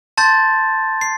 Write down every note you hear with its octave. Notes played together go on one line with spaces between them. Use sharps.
A5 C6 G6 A6
C7